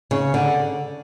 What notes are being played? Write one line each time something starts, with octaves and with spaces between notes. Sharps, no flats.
C#3
D3